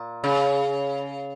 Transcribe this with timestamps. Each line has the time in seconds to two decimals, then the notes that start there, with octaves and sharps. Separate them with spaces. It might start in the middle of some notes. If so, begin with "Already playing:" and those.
Already playing: A#2
0.24 C#3